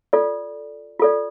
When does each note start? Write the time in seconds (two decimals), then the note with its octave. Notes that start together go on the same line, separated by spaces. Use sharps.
0.13 F4 A4 D5
1.00 F4 A4 D5